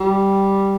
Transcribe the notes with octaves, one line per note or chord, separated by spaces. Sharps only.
G3